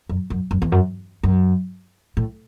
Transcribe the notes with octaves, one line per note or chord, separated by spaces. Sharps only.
F#2
F#2
F#2
E2
F#2
F#2
A2